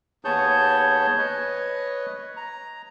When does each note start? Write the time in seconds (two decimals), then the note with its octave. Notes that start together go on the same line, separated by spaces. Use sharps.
0.25 D#2 B3 G#4 C#5 A5 G6
1.18 B4 C#5 D#5
2.36 A#5